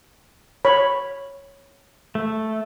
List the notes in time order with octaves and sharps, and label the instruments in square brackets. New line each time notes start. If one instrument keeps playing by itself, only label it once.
[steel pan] C#5 B5
[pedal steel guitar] A3